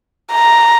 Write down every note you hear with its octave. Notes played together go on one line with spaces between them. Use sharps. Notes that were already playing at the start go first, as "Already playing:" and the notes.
A#5